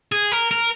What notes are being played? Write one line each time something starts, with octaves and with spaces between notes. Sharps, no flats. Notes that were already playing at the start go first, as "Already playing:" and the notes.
G#4
A#4
A#4